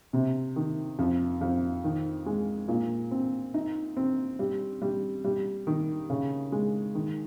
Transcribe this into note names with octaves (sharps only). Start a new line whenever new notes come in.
C3
D#3
F2
F2
D#3
G#3
A#2
C4
D#4
C4
G3
G3
G3
D#3
C#3
G#3
D#3